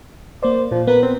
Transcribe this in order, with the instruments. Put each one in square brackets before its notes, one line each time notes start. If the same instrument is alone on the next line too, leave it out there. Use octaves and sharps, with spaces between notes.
[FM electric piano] A#3 D5 [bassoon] C5
[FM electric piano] A#2 [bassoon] F3
[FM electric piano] B3 A#4 [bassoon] B4
[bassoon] C4